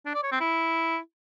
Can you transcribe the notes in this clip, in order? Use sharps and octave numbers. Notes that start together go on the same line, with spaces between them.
D4
D5
C#5
C4
E4